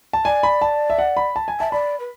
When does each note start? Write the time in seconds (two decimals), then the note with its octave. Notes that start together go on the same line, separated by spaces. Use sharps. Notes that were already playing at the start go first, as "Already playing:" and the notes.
0.13 A5
0.25 D5 G#5
0.43 B5
0.62 A5
0.90 E5
0.98 F#5
1.17 B5
1.36 A5
1.48 G#5
1.60 E5 A5
1.72 D5 B5
2.00 B4